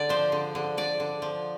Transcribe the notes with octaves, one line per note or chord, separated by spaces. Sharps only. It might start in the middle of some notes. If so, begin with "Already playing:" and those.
Already playing: D3 D5
F3 C5
D3
D3
D3 D5
D3
F3